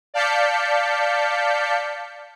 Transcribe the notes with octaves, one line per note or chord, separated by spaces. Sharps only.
D5 F5 A5 G6 B6 C#7